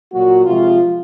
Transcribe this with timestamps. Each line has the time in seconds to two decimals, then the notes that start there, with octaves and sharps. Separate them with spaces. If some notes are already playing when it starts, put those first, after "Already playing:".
0.12 A#2 F#3 A#3 F#4
0.46 C3 F3 G#3 F4